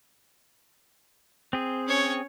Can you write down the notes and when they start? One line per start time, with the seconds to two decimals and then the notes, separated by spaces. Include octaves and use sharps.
1.53 C4 G#4
1.87 C#4 C#5